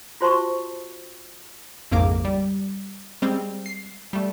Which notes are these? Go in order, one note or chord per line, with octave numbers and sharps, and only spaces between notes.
F4 F#4 C5 A5 C6 C#6
A#1 F2 G#2 C#3 A#3 D6
G3
G3 G#3 C4
C7
G3 A3